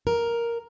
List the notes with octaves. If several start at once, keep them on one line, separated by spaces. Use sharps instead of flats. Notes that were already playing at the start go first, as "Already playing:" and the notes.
A#4